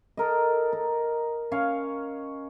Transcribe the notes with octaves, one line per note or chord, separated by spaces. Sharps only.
A4 A#4 D#5
A#4
C#4 C#5 F5